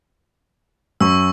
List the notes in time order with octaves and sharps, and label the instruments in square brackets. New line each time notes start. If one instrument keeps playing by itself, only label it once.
[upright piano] F#2 [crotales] C#6 E6